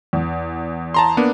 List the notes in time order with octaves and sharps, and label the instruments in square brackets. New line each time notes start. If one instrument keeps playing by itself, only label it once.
[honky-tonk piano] E2
[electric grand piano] A5 A#5 C6
A#3 B3 D4